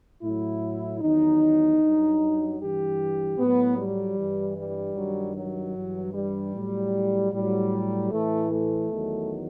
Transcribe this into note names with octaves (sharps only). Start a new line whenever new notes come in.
A2 F#3 E4
E2 D#3 F#3 D#4
G2 F#3
G2 E3 G4
A2 F#3 B3
G3
G2 E3
G3
G2 D#3 F#3
F#3
G2 E3
G3
A2 F#3
A2 F#3 G3
A2 E3 A3
A3
E2 D#3 F#3